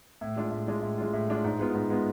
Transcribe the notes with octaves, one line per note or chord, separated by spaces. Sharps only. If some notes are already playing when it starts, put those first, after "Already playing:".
A2
G#3 D4 F4
A2
G#3 D4 F4
A2
G#3 D4 F4
A2
G#3 D4 F4
G#2
G#3 B3 F4
G#2
G#3 B3 F4